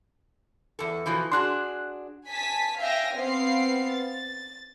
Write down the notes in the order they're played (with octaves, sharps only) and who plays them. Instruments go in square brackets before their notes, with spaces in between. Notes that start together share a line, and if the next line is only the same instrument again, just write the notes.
[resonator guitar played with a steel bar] E2 A4
B2 E3 F3
[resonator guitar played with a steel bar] D4 F#4 G#4 [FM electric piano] C6 F#6
[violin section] G#5 A5 B6
E5 F5 G5 G#5 A#6
B3 C4 F5 C7
A6